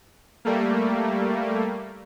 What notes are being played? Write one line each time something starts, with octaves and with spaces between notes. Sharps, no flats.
G3 A3 A#3